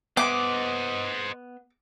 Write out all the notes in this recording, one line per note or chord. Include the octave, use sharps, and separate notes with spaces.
B3 C5 D#5 E5 C6 D6